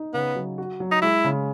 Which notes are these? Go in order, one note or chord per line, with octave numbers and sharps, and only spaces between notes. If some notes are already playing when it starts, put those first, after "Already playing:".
Already playing: D#4
C#3 B3
F#3
F#4
F#3
D#4
G#3 E4
C#3